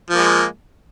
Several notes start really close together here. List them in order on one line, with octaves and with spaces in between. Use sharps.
F3 A#3 G#3